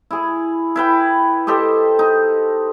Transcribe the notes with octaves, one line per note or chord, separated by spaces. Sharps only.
E4 G#4
E4 B4 G5
G4 A4 C5 D#5
D#4